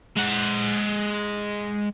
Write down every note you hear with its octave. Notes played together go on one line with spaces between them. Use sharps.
G#3 F#5